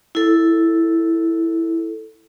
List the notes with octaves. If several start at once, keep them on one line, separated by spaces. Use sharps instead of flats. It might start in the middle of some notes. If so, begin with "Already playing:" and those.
E4 A4